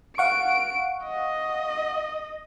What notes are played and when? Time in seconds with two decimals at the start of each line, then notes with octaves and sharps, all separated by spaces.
0.18 F5 F#5 C#6 D7
1.04 D#5